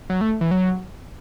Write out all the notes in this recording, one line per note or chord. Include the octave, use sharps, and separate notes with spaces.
F#3
A3
E3
F#3